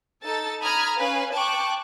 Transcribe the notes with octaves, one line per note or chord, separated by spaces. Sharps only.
D#4 A4 A5 A6
A#5 B5 D#6 F6 G#6
C#4 B4 F5 G#5
G5 A5 C#6 D6 F#6